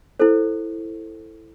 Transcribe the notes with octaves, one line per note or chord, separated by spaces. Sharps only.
E4 A4 C5